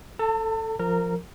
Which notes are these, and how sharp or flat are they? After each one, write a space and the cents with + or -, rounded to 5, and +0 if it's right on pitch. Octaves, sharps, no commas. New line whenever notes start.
A4 +5 A5 +40
F3 +0 A#4 -20 A#5 +0